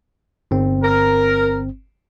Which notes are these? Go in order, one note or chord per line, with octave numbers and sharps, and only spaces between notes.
G1 C4
A#4